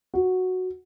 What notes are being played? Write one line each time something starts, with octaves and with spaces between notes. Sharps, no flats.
F#4